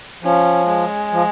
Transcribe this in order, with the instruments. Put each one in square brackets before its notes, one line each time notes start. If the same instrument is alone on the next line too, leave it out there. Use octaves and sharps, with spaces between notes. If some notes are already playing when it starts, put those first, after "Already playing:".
[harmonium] F3 [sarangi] C#4
[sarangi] G#3
[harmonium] F3